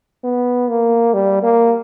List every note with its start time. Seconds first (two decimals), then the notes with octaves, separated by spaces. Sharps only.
0.24 B3
0.69 A#3
1.14 G3
1.43 A#3